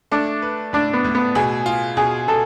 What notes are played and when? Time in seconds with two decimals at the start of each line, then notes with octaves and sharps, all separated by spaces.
0.12 A3 D4
0.42 B4
0.73 A2 D4
0.93 B3
1.04 A2
1.15 B3
1.35 B2 G#4
1.66 F4
1.97 B2 G#4
2.28 B2 A4